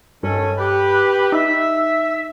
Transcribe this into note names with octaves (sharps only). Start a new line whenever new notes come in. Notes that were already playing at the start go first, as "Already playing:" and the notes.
G2 D#3 C#4 A4
G4 B4
D#4 E5